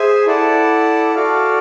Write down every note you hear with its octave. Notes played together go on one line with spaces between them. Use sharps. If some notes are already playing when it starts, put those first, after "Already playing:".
Already playing: G#4 C5 E5 G#5
E4 A4 D5 F#5 A5
F#4 A4 D5 F5